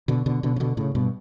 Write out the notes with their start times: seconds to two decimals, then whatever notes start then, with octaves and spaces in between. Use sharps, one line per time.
0.08 B2 D3
0.26 B2 D3
0.43 B2 D3
0.56 C#3
0.60 B2 D3
0.77 A2 C#3
0.95 G2 B2